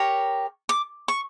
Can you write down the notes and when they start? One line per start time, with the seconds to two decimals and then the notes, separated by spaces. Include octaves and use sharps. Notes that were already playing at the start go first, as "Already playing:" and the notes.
Already playing: G4 A#4 C#5
0.69 D6
1.08 C#6